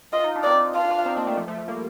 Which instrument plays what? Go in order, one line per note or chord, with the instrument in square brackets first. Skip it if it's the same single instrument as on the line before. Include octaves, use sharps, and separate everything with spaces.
[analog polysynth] F4 [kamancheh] D#5
[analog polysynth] D#4
D4
[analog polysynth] C4 D#4 [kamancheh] D5
[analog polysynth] D4 F4 [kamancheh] F5
[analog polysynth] D4 F4
C4 D#4
A#3 D4
A3 C4
F3 A3
F3 A3
F3 A3
G3 A#3